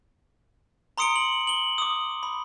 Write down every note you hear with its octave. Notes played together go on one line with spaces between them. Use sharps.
A#5 C6 D#6 C#7 D7 G7
F#7
F#7 G7
D6 D#6
B5